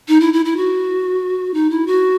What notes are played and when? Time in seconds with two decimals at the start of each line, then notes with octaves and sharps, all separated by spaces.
0.08 D#4
0.20 E4
0.33 E4
0.45 E4
0.57 F#4
1.54 D#4
1.70 E4
1.87 F#4